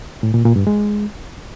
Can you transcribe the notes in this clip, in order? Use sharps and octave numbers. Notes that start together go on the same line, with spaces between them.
A2
A#2
A#2
G2
G#3